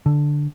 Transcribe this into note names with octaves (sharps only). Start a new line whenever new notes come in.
D3